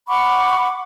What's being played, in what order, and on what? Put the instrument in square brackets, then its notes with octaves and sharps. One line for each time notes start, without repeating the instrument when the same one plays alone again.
[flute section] F#5 B5 C#6 D6